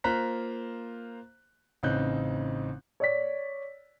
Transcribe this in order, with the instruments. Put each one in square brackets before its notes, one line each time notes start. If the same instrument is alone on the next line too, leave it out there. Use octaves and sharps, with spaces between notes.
[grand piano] A#3 F4 C5 A#5 F#6 B6
A1 C#3 C4 D#4 F#6 G6
C#5 D5 B6